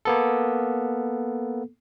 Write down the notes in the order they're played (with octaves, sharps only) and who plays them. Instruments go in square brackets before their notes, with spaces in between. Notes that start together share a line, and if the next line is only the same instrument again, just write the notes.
[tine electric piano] A#3 B3 A4